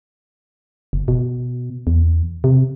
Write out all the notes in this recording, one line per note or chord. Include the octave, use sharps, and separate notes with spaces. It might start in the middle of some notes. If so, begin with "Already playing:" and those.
F#1
B2
E2
C3